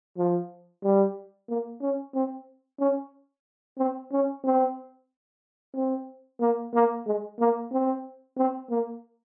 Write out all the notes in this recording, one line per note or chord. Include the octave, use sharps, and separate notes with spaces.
F3
G3
A#3
C#4
C4
C#4
C4
C#4
C4
C4
A#3
A#3
G#3
A#3
C4
C4
A#3